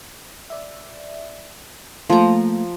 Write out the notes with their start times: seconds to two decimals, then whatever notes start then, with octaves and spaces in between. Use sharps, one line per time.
0.50 D5 E5
2.10 F3 A3 A#3 A#4 A#5